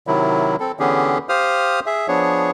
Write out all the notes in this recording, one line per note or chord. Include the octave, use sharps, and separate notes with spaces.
C3 D#3 F#3 E4
C4 A4
D3 E3 B3 C#4 G4 G#4
G4 C5 F5 D#6 F6
G#4 E5
F3 B3 D4 G#4 C#5